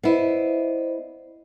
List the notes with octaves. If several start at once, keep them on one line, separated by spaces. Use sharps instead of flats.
B3 E4 C5 D5 D#5